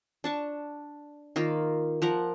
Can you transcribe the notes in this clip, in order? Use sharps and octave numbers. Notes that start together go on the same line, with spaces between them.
D4 A5 C#6
D#3 A#3 F4
F3 A#4 F#5